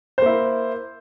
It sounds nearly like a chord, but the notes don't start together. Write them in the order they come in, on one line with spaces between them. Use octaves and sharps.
C5 A#3 E4